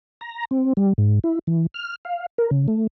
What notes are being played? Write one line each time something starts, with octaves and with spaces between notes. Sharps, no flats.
A#5
C4
G3
G#2
E4
E3
F6
F5
A#4
C#3
A3